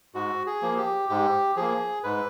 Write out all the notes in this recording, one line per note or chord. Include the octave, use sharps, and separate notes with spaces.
G#2 F#4
G#4
F3 A#3
G4
G#2 G4
F3 A#3 G#4
G#2 B4